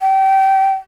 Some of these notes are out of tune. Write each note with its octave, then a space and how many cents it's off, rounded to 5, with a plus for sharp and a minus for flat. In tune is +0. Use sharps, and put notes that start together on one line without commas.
G5 -25